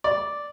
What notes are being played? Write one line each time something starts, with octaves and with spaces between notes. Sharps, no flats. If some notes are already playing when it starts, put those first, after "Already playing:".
D5